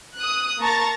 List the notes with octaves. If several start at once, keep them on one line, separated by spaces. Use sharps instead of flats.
D#6 F#6
A#3 A5 A#5 C#6 A6